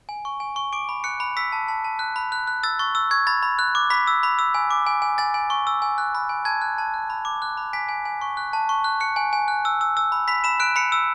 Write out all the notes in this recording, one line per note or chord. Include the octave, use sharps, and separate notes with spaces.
G#5
C#6
G#5
C#6
D6 D7
B5
F#6 C#7
B5
E6 B6
A5
A5
A5
F#6
B5
F#6
F#6
E6 A6
C#6 A6
E6
C#6 G#6
B5 A6
B5
F#6
D6
B5 B6
E6
B5
E6
G#5
D6
G#5
G#5
G#5 A6
G#5
C#6
E6
G#5
F#6
B5
G#5
A5 G#6
F#6
A5
F#6
B5
D6
F#6
B5
G#5 B6
G#5
G#5
C#6
F#6
A5
C#6
F#6
F#6 C#7
G#5
G#5
F#6
E6
E6
E6
B5
B5 B6
B5 E7
F#6 D7
B5 C#7
E6